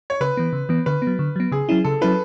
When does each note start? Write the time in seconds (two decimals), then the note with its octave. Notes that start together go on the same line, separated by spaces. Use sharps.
0.10 C#5
0.21 C#3 B4
0.37 E3 B3
0.53 C#3
0.69 E3 B3
0.86 D3 B4
1.02 F#3 B3
1.19 D3
1.36 F#3 B3
1.52 C#3 G#4
1.69 F#3 C#4 E4
1.85 C#3 A4
2.01 F#3 C#4 E4 B4